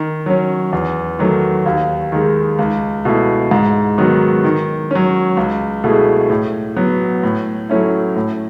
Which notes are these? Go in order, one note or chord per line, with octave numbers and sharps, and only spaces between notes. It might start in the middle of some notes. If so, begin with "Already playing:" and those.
Already playing: D#3
F#3 C#4
E2
D#3 F#3 A3
D#2
D#3 G#3
C#2
B2 A3 E4
G#2
D#3 F#3 B3 F#4
D#3
F#3 C#4
C#2
B2 A3 E4 G#4
A2
F#3 B3
A2
F#3 A3 C#4 E4
A2